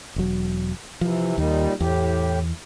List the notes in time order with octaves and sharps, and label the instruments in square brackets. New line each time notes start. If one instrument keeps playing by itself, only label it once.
[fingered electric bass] E1 F#3
[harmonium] C3 E3 [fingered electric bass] F3
[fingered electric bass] D#2 [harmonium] A#2 G3 D#4
[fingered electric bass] E2 [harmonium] A2 G4